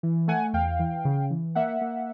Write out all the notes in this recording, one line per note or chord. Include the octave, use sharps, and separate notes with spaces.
E3
A3 F#5 G#5
E2 F5 G5
E3
C#3
E3
A#3 E5 F#5
A#3